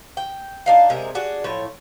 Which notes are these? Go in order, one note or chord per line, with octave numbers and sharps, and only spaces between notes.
G5
D4 D#4 F5
C3 G#3 G#4 A#4
D4 F#4 G#4
A2 F3 C#5